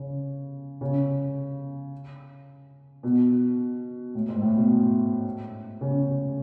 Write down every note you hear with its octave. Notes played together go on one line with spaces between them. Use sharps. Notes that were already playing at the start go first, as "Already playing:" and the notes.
Already playing: C#3
C#3
B2
A2
G#2
A2
B2
C#3